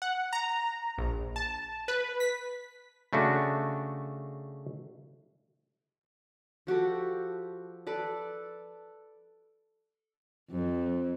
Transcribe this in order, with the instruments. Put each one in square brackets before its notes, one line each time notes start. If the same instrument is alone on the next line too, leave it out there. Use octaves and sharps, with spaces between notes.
[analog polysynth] F#5
A#5
A#1
A5
B4
B6
[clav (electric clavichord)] C#3 A3 D4 F#4
[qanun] F3 F#4 G4 A4
A4 B4 D5
[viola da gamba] F2